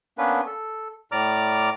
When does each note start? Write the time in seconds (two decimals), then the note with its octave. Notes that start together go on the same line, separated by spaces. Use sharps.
0.18 A#3 B3 C#4 D4 B4
0.46 A4
1.12 A2 D5 A#5 D6 F6